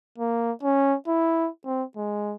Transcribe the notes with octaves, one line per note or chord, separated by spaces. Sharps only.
A#3
C#4
E4
C4
G#3